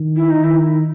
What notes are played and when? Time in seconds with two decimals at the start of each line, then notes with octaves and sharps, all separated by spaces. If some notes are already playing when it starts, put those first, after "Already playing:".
Already playing: D#3
0.16 E4
0.30 D#4
0.40 D#3 E4